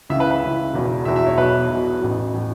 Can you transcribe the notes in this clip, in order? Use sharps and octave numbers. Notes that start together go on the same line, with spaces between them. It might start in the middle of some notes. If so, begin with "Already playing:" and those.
C#2 C#3 E3 E5
B4
B4
C#2 C#3 E3
E1 E2 B2
E1 E2 B2 E5
E5
C#5
B1 B2 B4
B1 B2
A1 A2 E3
A2 E3